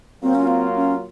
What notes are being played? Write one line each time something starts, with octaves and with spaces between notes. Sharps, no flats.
F#3 A#3 C4 F4
C#4
C4
C#4